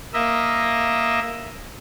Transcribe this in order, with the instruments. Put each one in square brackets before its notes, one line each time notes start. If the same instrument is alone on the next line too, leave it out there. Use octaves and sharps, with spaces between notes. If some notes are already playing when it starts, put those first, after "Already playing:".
[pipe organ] A#3 D#5 E5